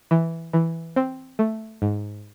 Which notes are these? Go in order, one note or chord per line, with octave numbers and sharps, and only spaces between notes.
E3
E3
C4
A3
G#2